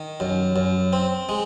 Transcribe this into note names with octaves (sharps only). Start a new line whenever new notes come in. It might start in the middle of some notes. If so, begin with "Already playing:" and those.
Already playing: D#3
F#2
F#2
C4
G#3